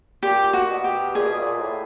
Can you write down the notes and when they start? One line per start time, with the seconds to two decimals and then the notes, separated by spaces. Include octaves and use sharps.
0.23 A#2 G4
0.53 F#4
0.69 B2
0.84 G4
1.15 A#2 G#4
1.27 B2
1.39 A#2
1.62 A2